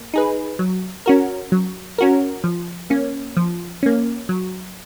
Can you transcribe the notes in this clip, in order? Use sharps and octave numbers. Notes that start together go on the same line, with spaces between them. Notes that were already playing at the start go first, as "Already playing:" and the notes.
Already playing: A#3
D#4 G#4 B4
F#3
C#4 F#4 A#4
F#3
C#4 F#4 A#4
F3
A#3 C#4
F3
A#3 C#4
F#3